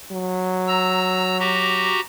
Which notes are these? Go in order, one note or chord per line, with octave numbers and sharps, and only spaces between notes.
F#3
A#5 E6
F#4 G4 A#5